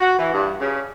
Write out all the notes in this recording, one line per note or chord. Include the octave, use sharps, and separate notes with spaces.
F#4
E3
G2
C#3